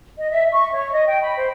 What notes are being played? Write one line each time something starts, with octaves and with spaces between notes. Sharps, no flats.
D#5
E5
C#6
C#5
D#5
G5
B5
C5